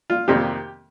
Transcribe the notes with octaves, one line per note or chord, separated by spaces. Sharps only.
F4
F2 C3 D#3 A#3 G4